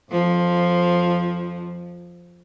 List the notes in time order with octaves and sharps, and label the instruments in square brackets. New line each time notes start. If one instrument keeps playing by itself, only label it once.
[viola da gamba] F2 F3